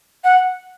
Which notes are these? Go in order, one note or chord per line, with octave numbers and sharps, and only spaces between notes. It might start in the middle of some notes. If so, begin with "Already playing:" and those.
F#5